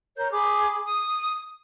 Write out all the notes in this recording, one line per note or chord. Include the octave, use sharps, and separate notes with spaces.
A#4 C#5 G6
G#4 B5 D6
D#6